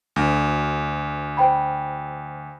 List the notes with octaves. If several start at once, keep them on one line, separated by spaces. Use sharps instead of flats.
D2
C5 G5 B5